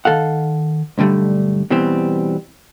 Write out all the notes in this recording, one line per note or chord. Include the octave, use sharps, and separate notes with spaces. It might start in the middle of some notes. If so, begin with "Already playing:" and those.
D#3 A4 F5 F#5
B1 G2 D3 G3 A3
B2 E3 G3 C4